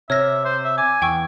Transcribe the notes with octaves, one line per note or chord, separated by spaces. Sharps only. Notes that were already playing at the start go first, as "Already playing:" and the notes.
C3 C#5 E5 F6 A#6
C5
E5
G#5 D6
E2 G5 C#6 E6